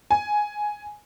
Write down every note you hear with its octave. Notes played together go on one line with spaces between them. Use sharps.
G#5